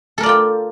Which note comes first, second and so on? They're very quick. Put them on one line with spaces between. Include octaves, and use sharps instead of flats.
A4 A#4 D5 F4 G5